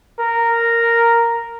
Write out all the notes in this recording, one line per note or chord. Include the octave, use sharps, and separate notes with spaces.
A#4